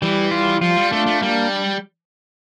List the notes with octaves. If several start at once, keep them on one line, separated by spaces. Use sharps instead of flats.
E3 G3
F4
F3 F4
G3
A3 D4
A3
G3 A#3